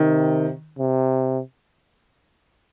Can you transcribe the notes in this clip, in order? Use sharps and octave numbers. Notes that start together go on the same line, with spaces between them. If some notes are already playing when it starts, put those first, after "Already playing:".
Already playing: C3 D#3
C3